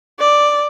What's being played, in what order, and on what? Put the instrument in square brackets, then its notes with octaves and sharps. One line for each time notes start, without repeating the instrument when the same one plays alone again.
[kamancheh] D5